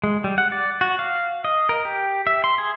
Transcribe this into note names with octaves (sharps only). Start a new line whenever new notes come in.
G#3
G3
F#5
D5
F#4
F5
D#5
A#4
G4
E5
C6
G#4